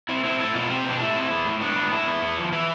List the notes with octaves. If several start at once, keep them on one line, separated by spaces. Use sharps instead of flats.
C4 E4
C4 E4
A3 E4
B2 F4
C4 G4
B2
D4
A3 E4
C4
B3
A2
B3 D4
B3
A2 E4
B3
B3
F3
E3 E4